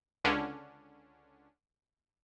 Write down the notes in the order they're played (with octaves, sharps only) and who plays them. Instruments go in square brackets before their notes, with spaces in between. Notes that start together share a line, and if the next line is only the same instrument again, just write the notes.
[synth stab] C#2 D3 C#4 D4